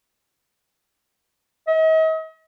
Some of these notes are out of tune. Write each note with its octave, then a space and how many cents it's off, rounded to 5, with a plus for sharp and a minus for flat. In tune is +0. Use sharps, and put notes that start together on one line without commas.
D#5 +40